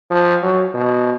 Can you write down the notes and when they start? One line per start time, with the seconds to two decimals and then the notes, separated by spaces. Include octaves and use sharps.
0.11 F3
0.43 F#3
0.74 B2